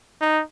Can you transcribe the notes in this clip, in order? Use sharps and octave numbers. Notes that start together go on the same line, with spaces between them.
D#4